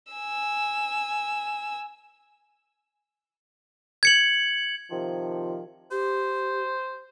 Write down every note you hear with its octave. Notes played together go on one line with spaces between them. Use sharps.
G#5 E6
G#6 C#7 F#7
C3 D#3 F3
G4 C5